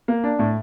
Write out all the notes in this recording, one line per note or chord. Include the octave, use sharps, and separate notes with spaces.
A#3
D4
A2